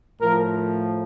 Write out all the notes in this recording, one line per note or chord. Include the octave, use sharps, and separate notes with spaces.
A2 F3 A#4